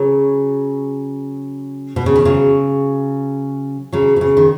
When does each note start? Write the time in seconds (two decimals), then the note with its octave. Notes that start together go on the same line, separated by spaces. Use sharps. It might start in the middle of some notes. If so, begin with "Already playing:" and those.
Already playing: C#3 F#3
1.96 B2
2.06 C#3
2.16 D#3
2.25 C#3 F#3
3.93 C#3 F#3
4.16 B2
4.21 C#3
4.37 D#3